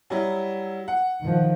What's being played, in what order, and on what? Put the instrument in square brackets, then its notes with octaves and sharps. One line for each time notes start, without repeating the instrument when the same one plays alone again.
[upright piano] F#3 G3 E4
F#5
[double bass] D#3 F3